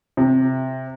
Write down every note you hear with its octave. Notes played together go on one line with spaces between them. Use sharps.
C3